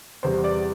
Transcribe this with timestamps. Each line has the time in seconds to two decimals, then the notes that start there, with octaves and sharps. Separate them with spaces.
0.23 E2 C3 G3 C5
0.44 D5